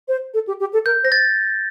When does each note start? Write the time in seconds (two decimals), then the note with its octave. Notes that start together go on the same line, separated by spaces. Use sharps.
0.08 C5
0.34 A4
0.47 G4
0.60 G4
0.73 A4
0.86 A#4 G6
1.04 C5 A#6
1.12 A6